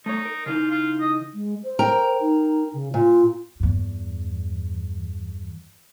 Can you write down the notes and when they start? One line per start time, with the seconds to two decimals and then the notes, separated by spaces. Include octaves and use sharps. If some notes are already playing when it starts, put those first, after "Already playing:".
0.06 A3 D#4 C#5
0.25 A#4
0.46 C#3 E3 D#4 F4
0.71 F4
1.01 D#5
1.34 G#3
1.64 C5
1.79 A#4 G5 A#5
2.21 D#4
2.73 C#3
2.94 A#2 F4
3.60 E2 G2